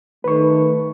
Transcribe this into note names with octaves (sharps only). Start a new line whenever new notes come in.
D#3 A3 B4 C#6